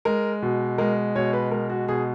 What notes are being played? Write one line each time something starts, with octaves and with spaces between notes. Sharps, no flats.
G#3 A#4
B2
G#3 A#4
B2 C#5
B4
G#3 A#4
F#4
B2 G#4